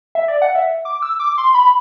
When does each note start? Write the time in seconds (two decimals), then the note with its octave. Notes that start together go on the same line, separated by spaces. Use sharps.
0.15 E5
0.28 D5
0.42 F#5
0.55 E5
0.85 D6
1.02 E6
1.20 D6
1.38 C6
1.54 B5